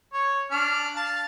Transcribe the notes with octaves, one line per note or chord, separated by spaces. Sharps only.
C#5
D4 F6
F5 A5